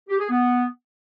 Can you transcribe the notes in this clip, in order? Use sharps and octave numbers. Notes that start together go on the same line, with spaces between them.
G4
G#4
B3